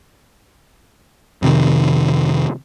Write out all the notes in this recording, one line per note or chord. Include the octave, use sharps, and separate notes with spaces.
F2 C3 D#3